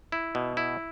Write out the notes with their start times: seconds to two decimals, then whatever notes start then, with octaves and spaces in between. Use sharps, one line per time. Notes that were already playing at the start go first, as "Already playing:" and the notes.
0.12 E4
0.35 B2
0.57 E4